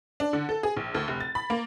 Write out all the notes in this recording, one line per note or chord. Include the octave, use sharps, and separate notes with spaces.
D4
D3
A4
G#4
A#1
D2
F1
A6
B5
A#3